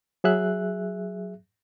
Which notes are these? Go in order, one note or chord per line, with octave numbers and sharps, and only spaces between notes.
F#3 G#4 E5 F#6